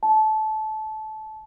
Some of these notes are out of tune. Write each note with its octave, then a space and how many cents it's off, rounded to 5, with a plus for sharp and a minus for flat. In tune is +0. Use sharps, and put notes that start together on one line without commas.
A5 -20